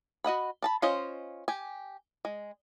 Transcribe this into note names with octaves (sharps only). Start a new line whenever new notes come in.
F#4 D#5 F#5 B5
D4 A5 B5
C#4 F4 C5 D#5 F5
G4 G#5
G#3